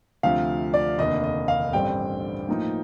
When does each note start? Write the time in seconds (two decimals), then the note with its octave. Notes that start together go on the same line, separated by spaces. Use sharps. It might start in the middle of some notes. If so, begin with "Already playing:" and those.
0.23 D2 C3 F3 F5
0.74 D5
0.98 F1 D#2 D3 D#5
1.24 D#5
1.48 F5
1.73 A1 G2 D3 G3 C4 G5
2.49 A2 F3 A#3 D#4